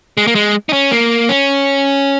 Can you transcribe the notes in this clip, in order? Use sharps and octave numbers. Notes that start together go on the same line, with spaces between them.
G#3
A#3
G#3
D#4
C#4
A#3
C#4